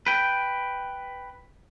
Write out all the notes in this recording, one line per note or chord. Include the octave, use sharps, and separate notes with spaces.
B4 G5